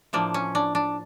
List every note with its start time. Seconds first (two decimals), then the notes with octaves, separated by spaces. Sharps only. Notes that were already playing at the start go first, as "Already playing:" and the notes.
0.13 A2 F3 A#3 D4
0.34 C#4
0.55 D4
0.75 D4